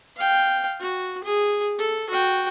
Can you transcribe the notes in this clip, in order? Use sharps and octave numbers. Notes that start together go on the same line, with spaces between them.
F5 G5
F#4
G#4
A4
F#4 G5